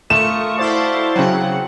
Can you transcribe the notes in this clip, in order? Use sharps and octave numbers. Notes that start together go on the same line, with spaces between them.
A3 F4 A#4 C#6 D#6 E7
E4 F#4 C5 D5 F5 A5
C#3 F#3 C4 F#5